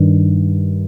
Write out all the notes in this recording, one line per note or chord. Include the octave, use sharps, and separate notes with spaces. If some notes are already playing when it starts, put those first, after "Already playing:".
Already playing: G2 D#3